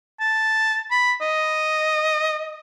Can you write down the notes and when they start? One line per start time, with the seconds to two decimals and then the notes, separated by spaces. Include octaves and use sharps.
0.20 A5
0.91 B5
1.21 D#5